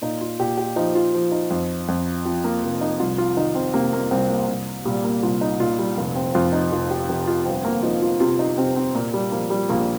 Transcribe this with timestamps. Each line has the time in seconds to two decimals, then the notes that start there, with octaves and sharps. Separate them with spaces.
0.02 A#2 D#4
0.21 F4
0.39 A#2 G4
0.57 G4
0.76 F3 D#4
0.95 F4
1.14 F3
1.32 D#4
1.50 F2
1.88 F2
2.25 F3 C4
2.44 A#3
2.63 F1
2.81 D#4
3.00 C2 F4
3.18 F4
3.37 D#3 D#4
3.55 C4
3.74 C3 A#3
3.93 A#3
4.11 C2 C4
4.30 A#3
4.48 C2
4.85 A#2 G3
5.04 A#3
5.23 C2 F4
5.41 D#4
5.60 A#2 F4
5.79 G3
5.97 F1
6.16 C4
6.35 F2 F4
6.53 D#4
6.72 F1 F4
6.90 G4
7.09 F1 G4
7.27 F4
7.46 G1 C4
7.65 A#3
7.83 F3 D#4
8.02 F4
8.20 C3 F4
8.39 D#4
8.57 C3 C4
8.76 C4
8.95 A#2 A#3
9.14 G3
9.32 F3 A#3
9.50 G3
9.69 A#1 A#3